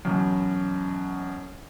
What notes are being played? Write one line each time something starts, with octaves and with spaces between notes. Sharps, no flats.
F#2 B2 E3